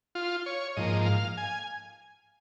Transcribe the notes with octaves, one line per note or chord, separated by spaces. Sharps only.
F4
C#5
G#2 F3 A#3 D#5
F5
G#5